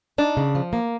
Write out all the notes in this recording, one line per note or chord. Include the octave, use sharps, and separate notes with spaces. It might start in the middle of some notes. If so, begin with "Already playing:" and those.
D4 D#4
C#3
F3
A#3